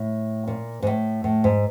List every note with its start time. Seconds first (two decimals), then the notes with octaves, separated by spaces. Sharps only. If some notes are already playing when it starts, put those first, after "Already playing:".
Already playing: A2
0.47 A#2
0.82 G#2
0.87 A2
1.24 A2
1.44 G#2